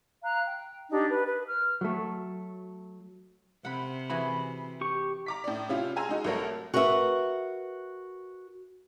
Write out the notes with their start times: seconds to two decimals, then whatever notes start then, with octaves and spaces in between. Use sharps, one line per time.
0.24 F5 A#5 F#6
0.46 G5
0.91 D4 D#4 G4
1.09 B4
1.25 B4
1.46 F6
1.81 F#3 A3
3.65 C3 F#5 B5
4.10 E3 F#4 G#4 B5
4.81 G4 C#6
5.26 A#5 D6 B6
5.44 A2 D5
5.69 C3 C#4 E4 F4
5.96 G#4 G#5 A#5 C6 E6
6.09 G#3 D#4 F#4
6.24 C2 F#3 A3 A4 A#4 C#5
6.74 F#4 A#4 B4 D#5 E5